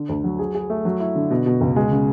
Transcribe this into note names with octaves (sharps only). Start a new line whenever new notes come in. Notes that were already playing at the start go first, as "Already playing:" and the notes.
Already playing: D3
D2
F#3
G#4
G#4
A3
F#3
E4
D3
B2
B2
C#2
G#3
C#3